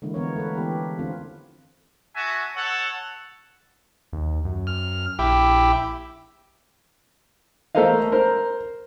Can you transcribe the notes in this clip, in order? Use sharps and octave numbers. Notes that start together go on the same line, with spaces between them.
D3 E3 G#3 A#3 E4
F3 B3 A#4 C#5
A3 B4
E3 B3 G4
D3 C4 F4
F#4 E5 G#5 A5
A4 C#5 F#5
D#2
F#2
F6
A#1 E4 G4
A3 A4 A#4 C5 D#5 F5
A#4 C5